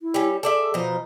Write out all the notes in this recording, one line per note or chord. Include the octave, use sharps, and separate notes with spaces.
E4
G3 C#4
G#4 A4 D5 E5
B2 F3 D#4